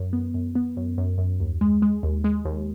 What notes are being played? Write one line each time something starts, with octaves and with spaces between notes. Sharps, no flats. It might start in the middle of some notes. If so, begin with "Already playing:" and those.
Already playing: F#2
B3
F#2
B3
F#2
F#2
F#2
D#2
G#3
G#3
D#2
G#3
D#2